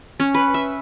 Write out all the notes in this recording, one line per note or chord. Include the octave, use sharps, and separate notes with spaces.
C#4
B4
E5